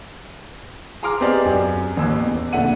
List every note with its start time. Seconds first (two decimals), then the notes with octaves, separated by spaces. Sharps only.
1.03 G#4 A#5 C6 D6 F6
1.21 B3 C4 G4 G#4 D5 D#5
1.45 F#2
1.97 A1 D#2 C#4 E6
2.19 E2
2.53 F2 A#2 D3 E5 F#5 D#7